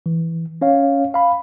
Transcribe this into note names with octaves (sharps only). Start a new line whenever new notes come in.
E3
C#4 C#5 F5
F5 B5